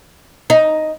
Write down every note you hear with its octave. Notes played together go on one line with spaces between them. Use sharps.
D#4